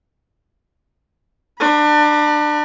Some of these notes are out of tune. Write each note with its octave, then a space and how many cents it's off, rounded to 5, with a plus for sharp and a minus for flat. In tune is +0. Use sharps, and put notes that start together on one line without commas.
D4 +25 B5 -25